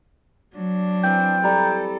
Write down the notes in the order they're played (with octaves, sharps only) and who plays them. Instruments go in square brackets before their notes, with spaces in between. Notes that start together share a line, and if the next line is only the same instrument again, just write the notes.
[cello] F#3 D4
[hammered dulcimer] E3 C4 [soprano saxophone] G5
[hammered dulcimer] G3 A#5 [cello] A4